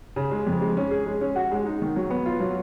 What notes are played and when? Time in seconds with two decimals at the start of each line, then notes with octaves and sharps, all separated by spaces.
0.16 C#3
0.31 G#3
0.47 F2
0.61 G#3
0.77 C#4
0.91 G#4
1.07 G#3
1.21 C#4
1.36 F#4
1.51 G#3
1.66 D#4
1.82 D#3
1.96 F#3
2.10 B3
2.26 F4
2.40 F#3